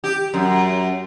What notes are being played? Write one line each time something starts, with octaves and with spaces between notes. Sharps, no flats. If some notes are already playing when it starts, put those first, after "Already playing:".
G4
F#2